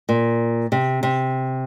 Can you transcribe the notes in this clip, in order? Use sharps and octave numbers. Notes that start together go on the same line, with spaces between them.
A#2
C3
C3